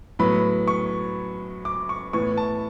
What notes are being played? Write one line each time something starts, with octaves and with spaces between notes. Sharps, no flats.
A2 F#3 B3 B5
C#6
D6
C#6
A2 E3 B3 C#6
A5